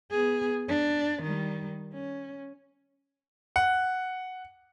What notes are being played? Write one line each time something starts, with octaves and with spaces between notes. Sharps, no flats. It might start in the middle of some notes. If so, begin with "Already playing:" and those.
B3 G#4
D4
D#3 G3
C#4
F#5